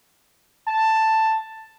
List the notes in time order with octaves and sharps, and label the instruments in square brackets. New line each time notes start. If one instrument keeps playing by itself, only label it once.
[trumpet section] A5